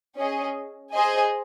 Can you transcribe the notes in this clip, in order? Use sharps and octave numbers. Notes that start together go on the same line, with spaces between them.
C#4 G#4 D#5
G#4 C5 D#5 G#5